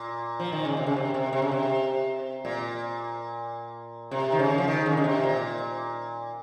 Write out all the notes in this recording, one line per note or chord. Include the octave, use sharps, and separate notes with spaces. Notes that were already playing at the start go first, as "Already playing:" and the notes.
Already playing: A#2
F3
D#3
C#3
C3
C#3
C3
C3
C3
C#3
C3
A#2
C3
D#3
C#3
F3
D#3
C#3
C#3
C3
A#2